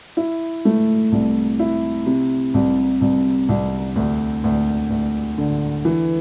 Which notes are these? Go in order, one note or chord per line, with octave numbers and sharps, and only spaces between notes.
E4
A3
C2
E4
C3
C2
C2
C2
D2
D2
D2
D3
E3